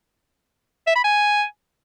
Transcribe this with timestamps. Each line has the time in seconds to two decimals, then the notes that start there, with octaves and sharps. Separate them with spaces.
0.87 E5
0.96 B5
1.04 G#5